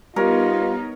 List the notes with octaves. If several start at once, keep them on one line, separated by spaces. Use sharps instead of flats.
G3 B3 D#4 F4 A#4 C#5